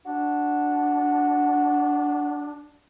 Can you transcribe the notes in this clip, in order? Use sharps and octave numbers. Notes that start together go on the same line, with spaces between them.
D4 F#4